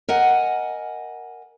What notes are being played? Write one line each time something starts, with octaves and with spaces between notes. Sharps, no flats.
A#4 D#5 F#5 G#5